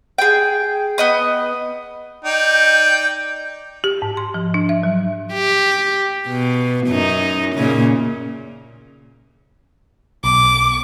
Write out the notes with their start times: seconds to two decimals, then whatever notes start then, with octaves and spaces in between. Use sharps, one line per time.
0.18 G#4 G5
0.98 B3 D#5 D#6
2.25 D#4 D5 G5
3.84 G4
4.02 G#2
4.17 C6
4.34 F3
4.54 D4
4.69 E5
4.83 F#3
5.33 G4
6.28 B2
6.87 F#2 D#4
7.55 A#2 C#3
10.24 B1 D6